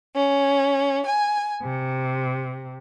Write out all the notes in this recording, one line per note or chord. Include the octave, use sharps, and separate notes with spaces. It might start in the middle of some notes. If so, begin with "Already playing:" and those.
C#4
G#5
C3